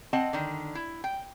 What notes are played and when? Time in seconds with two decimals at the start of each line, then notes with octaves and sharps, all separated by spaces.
0.13 C4 D#5 F#5 A5
0.33 D3 D#3
0.75 E4
1.04 G5